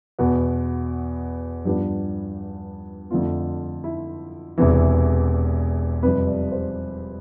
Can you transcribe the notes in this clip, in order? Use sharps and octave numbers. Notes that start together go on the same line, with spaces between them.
E2 B2 B3
G2 F3 B3 D4 G4
F2 D3 A3 D4 F4
E4
E1 E2 C3 E3
F2 C3 G3 B4
D5
C5